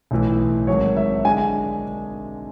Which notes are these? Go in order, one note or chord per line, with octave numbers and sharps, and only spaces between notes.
B1 A2 E3
G#1 G#2 F#3 C#5
E5
D3 G#3 D4 G#5